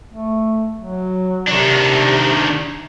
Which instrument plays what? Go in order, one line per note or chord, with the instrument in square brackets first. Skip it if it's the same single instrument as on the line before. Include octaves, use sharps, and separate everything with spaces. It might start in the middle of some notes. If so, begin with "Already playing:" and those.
[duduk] A3
F#3
[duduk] C3 [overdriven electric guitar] D#3 D4